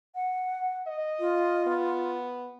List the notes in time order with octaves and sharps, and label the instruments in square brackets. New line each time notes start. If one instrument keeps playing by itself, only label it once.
[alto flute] F#5
[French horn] D#5
[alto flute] F4
[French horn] B3